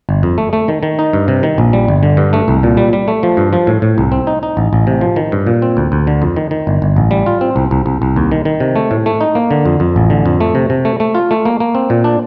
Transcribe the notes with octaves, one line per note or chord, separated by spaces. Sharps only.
G1
F2
A3
A3
D#3
D#3
D#4
G2
C3
D#3
A#1
G3
G1
D3
G2
A3
C2
A#2
G3
G3
A3
F3
G2
F3
A2
A2
C2
C4
D#4
D#4
A1
A1
C3
F3
D#3
G2
A#2
C4
D2
D2
D3
F2
D#3
D#3
G1
G1
A1
G3
F4
C4
C2
C2
C2
C2
D#2
D#3
D#3
C3
A3
A2
A3
D#4
A#3
D3
F2
F2
A1
D3
F2
A3
C3
C3
A3
A3
F4
A3
A#3
A#3
C4
A#2
D4